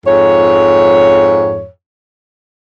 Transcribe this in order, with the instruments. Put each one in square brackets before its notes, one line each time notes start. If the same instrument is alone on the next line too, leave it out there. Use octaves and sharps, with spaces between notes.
[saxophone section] F2 G#2 C#5